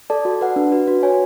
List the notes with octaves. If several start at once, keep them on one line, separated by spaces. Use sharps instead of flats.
A4 D5 A5
F#4
B4 F#5
D4
F#4 B4
F#4
C#5 G#5